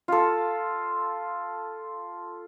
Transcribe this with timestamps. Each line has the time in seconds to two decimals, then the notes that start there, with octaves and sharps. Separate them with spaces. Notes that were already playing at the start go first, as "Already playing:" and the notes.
0.08 F4 A4